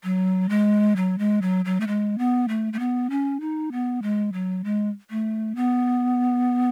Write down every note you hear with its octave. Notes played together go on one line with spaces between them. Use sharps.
F#3
G#3
F#3
G#3
F#3
F#3
A3
G#3
B3
A3
A3
B3
C#4
D#4
B3
G#3
F#3
G#3
A3
B3